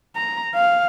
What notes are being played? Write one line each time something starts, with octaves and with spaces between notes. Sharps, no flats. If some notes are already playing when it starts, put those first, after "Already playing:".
A#5
F5